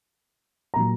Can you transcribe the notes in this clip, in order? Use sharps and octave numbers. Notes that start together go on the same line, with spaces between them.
A#2 F#3 A#5